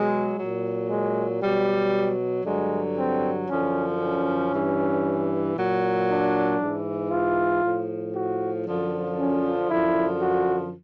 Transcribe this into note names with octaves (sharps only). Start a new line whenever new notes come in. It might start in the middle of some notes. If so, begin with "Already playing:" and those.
Already playing: B2 F#3 G#3
A#2 F#3
G#3
B2 F#3 G3
G2 D3 F#3 G#3
C4
F#2 D3 F3 C#4
C#4
G2 E3
A#2 F#3
D4
G#2 E3
F4
A2 F3
F#4
F#2 D3 F3
C#4
F#2 D3 F3 E4
F#4